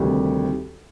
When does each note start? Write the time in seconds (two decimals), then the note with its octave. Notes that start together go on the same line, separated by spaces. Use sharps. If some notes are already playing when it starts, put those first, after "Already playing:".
Already playing: D2 C3 D#3 G3